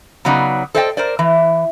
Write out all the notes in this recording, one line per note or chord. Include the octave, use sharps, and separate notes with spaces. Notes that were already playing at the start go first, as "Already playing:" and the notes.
C#3 F#3 B3 D#4 D5
A4 C5 D5 D#5 F5 G5
A#4 C5 D5
E3